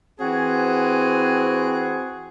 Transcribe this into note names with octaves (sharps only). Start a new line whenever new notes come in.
E3 C4 F#4 G#4 G#5